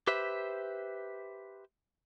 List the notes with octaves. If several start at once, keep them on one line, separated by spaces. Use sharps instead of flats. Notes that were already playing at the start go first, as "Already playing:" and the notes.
G4 B4 C5 E5